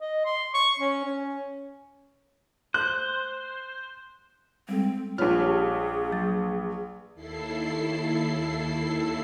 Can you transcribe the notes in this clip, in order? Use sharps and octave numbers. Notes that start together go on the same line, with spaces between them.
D#5
C6
C#6
C#4
C#4
C5 F#6
G3 G#3 C4 A4
A#1 F4 G#4 B4 C#5 F6
G4 C#5 A5
F#3 A6
D#2 E4 A4 C7